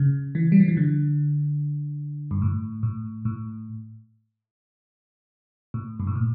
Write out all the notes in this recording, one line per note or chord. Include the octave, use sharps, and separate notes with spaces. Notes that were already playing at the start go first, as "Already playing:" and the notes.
Already playing: C#3
E3
G3
F3
E3
D3
G2
A2
A2
A2
A2
G2
A2
A#2